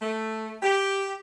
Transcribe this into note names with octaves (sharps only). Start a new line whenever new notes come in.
A3
G4